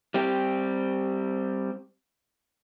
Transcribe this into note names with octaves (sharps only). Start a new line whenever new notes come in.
G3 C4 G4